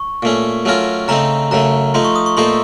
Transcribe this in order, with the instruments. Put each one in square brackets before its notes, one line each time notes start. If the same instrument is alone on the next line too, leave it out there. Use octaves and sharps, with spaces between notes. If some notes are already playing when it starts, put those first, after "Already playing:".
Already playing: [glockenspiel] C#6
[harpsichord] A#2 A3 C#4
F#3 A3 C#4 F4 A#4
[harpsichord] C#3 A3 C4 D#4 [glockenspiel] A#5
[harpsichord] F#2 C#3 A3 [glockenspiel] A#5
[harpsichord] F3 A3 D#4 [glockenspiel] C6
[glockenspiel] C#6
D#6
C#6
[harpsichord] A#2 A3 D#4 A4 C5 [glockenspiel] C6